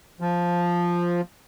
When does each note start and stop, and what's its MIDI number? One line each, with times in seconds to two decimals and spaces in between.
0.21 1.21 53